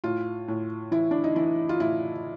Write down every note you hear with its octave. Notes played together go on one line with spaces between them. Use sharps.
A2 F4
A2
E3 E4
D4
D#4
E3 E4
F4
A2 E4